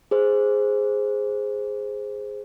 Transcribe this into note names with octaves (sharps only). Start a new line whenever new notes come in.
G#4 C5